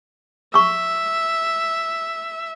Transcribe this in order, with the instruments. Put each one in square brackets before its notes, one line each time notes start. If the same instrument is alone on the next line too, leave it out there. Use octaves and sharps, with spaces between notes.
[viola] E5 [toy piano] C#6 E6